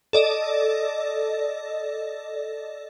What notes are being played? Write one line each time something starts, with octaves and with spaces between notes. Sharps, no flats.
A4 D5 D#5